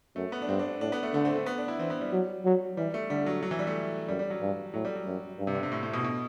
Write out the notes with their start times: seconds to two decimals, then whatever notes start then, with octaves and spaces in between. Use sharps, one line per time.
0.16 F#2 A3
0.32 B3
0.42 D4
0.49 G2 C4
0.59 D4
0.81 A2 D4
0.92 B3
1.03 A3
1.14 D3 A3
1.25 C4
1.36 A3
1.46 B3
1.58 D4
1.68 E4
1.79 E3 C4
1.90 B3
2.01 G3
2.12 F#3
2.45 F#3
2.77 E3 G3
2.94 A3
3.10 D3 G3
3.26 F#3
3.43 F#3
3.51 E3
3.59 G3
3.67 A3
4.09 F#2 G3
4.19 G3
4.30 F#3
4.41 G2
4.74 A2 F#3
4.85 G3
4.95 F#3
5.06 F#2
5.39 G2
5.47 C3
5.55 D3
5.63 C3
5.72 A2
5.83 A2
5.93 B2
6.04 B2